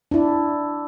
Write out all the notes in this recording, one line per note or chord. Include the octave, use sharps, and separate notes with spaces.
D4 E4